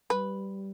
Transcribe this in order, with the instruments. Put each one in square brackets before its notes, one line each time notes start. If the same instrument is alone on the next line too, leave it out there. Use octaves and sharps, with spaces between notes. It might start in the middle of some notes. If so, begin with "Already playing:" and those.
[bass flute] G3 [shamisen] B4